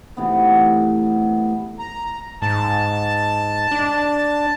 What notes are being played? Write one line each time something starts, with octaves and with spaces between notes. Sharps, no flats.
C3 E3 A3 B3
A#5
G#2 A5
D4